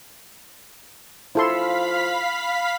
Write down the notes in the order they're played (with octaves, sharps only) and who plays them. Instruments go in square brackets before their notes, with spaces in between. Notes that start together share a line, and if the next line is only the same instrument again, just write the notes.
[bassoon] F3 [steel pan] E4 A4 C6 [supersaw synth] F5 B5 B6